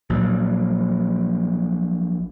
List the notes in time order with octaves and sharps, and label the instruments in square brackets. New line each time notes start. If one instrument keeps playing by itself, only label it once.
[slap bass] A#1 A#2 F#3 G3